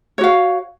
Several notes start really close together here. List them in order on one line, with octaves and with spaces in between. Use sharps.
C#5 F#4 F5